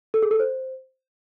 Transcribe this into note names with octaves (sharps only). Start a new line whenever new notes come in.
A4
G#4
A4
C5